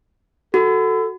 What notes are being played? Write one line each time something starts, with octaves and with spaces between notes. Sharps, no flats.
F#4 A4